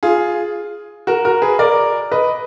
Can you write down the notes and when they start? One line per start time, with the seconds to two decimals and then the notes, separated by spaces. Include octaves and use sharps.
0.03 F4 G#4
1.07 F#4 A#4
1.25 F#4 A#4
1.42 G#4 B4
1.59 A#4 D5
2.12 B4 D#5